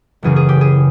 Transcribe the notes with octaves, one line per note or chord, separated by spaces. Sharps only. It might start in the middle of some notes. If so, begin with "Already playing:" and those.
F#1 F#2 C#3 E3 G#4
G#4
G4
G#4